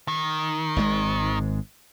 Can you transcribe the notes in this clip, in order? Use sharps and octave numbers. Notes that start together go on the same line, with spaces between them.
D#3
G#1 G#2 G#3